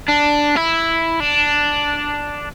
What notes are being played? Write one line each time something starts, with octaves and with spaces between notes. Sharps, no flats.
D4
E4
D4